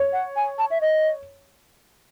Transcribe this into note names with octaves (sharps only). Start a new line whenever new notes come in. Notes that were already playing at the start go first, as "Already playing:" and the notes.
Already playing: C#5
F#5
G#5
A5
E5
D#5